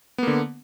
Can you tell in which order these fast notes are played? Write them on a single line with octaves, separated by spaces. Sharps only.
B3 A#3 D3